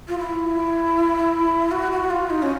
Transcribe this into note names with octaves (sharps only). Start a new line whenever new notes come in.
F4
E4
F#4
F#4
F4
D#4
C#4